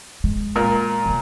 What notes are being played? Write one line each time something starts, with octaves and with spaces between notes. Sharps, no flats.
G#3
A#2 A#4
C3 G3